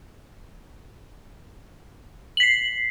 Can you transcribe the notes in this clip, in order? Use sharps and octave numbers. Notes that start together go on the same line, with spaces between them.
B6 C7 F#7